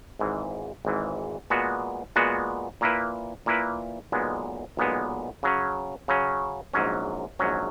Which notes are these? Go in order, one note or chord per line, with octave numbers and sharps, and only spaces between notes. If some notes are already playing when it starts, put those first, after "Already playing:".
G#1 G#2 E3
G#1 G#2 E3
A#2 G#3 B3 F#4
A#2 G#3 B3 F#4
A#2 A#3 E4 B4
A#2 A#3 E4 B4
B1 A#2 G#3 B3
B1 A#2 G#3 B3
C#3 F#3 C#4
C#3 F#3 C#4
A#1 G#2 F#3 C#4
A#1 G#2 F#3 C#4